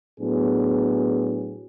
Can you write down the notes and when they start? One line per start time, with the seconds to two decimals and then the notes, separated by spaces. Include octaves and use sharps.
0.19 A2 F#3 B3 D4 G#4